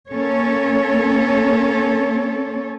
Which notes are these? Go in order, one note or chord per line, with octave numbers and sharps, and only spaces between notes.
A#3 C#4 A4 C#5